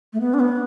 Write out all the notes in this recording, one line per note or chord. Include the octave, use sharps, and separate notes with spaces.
A3
B3
D4
B3